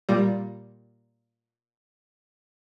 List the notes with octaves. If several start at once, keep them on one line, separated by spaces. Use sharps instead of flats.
A#2 G3